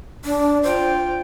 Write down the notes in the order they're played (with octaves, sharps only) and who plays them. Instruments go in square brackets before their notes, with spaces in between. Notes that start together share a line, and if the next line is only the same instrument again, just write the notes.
[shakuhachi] D4
[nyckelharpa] F4 G5 [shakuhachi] C5